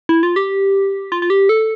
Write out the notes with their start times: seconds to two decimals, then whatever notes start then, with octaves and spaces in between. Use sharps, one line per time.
0.09 E4
0.23 F4
0.36 G4
1.12 F4
1.22 F4
1.30 G4
1.49 A4